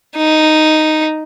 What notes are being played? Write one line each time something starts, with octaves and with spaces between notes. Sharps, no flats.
D#4